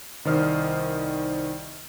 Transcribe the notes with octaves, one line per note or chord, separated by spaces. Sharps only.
C2 D#3 C5 D5 D#5 F6